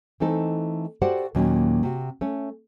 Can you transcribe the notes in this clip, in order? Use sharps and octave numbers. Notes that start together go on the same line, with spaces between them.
E3 A3 C4 D#4 A4
F#4 G4 A4 C5 D5 F#5
D#2 A#2 F#3 A#3 C#4
C3 F#4
A3 C#4